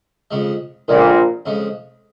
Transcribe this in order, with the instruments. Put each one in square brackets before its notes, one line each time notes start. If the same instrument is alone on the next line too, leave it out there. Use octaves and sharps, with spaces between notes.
[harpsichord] F2 C#3 G#3
[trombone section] A#1 A#2 [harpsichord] F2 C#3 G#3
[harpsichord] F2 C#3 G#3